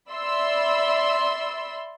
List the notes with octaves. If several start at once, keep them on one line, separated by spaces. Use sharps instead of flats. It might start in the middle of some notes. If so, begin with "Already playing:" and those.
D5 E5 B5 C6 E6